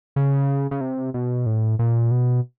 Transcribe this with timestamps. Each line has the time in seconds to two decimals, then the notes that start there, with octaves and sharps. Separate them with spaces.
0.16 C#3
0.71 C#3
0.81 C3
1.14 B2
1.46 A2
1.79 A#2
2.11 B2